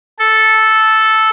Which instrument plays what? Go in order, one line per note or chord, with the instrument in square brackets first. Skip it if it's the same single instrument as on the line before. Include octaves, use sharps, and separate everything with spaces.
[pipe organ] A4